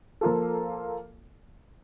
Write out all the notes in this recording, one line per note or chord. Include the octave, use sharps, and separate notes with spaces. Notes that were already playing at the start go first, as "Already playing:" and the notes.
F3 A#3 F4 A4